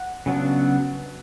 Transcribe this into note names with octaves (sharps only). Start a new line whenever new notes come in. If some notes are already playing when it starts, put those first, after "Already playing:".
Already playing: F#5
C#3 F#3 B3 D4